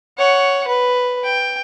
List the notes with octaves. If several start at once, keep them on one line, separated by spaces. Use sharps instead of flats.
C#5 F#5
B4
G5